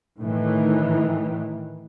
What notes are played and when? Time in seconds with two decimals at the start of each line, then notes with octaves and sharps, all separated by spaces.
0.19 A2 D#3 E3